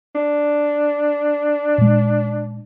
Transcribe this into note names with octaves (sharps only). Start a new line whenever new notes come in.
D4
A#2 G#3